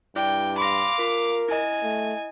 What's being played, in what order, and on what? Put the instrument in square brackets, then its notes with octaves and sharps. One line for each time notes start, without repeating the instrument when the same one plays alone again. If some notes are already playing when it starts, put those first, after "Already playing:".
[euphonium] G2 [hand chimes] E4 D5 D6 [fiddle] G5
[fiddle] F5 D6 [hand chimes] B5 C6 A#6
[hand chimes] F4 [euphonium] A#4
[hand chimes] E4 D#5 [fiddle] G#5
[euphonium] A3